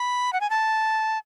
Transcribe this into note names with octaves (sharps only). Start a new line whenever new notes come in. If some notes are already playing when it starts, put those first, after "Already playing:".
Already playing: B5
F#5
G#5
A5